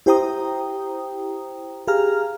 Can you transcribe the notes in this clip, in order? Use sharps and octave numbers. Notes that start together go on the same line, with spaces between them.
E4 G4 C5 G5 A#5 D#6
G4 G#4 F5 A#5 F6